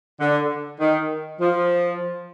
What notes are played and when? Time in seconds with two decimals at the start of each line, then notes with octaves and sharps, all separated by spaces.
0.20 D3
0.80 D#3
1.40 F3